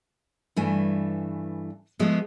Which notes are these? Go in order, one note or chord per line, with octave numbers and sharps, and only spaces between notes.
G2 E3 A3 G#5
F3 G#3 A3 B3